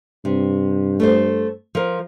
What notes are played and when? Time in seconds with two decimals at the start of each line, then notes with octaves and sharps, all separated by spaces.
0.25 G2 C3
1.00 A3 A4 C5
1.75 F3 A#4